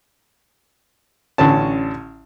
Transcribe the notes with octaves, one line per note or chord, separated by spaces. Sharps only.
A1 D3 C#4 A5